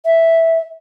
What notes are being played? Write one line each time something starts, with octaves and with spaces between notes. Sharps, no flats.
E5